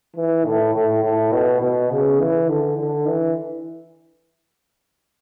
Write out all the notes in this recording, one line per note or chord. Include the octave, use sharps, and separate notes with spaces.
E3
A2
A2
A2
B2
B2
C#3
E3
D3
D3
E3